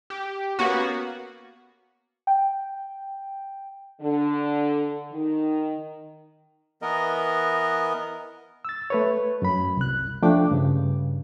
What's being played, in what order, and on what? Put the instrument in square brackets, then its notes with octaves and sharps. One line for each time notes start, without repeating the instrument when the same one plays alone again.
[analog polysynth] G4
A#3 B3 C#4 F#4
[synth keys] G5
[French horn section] D3
D#3
[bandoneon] E3 B3 A#4 D#5
[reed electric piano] E6 A6
A3 B4 C#5
F#2 B5
C2 F#6
F3 A3 D4 G5 D6
G2 C#3